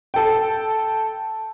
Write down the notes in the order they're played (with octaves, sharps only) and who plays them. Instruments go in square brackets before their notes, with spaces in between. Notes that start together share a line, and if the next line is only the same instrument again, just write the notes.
[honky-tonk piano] A4 G5